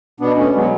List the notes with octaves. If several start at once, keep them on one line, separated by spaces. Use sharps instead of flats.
B2 B3 D4
A3 C#4
F#3 G#3 B3